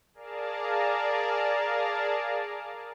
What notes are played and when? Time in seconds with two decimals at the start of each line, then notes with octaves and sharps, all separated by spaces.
0.14 G#4 A#4 D5 F5 A5 A#5